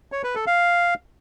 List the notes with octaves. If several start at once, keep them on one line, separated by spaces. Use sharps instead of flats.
C#5
B4
A4
F5